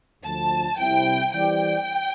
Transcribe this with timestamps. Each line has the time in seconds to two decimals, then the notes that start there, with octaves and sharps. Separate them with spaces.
0.24 D2 D3 F3 A5
0.79 C2 C3 G3 C4 E4 G5
1.34 E3 G3 C4 G4 D5 G5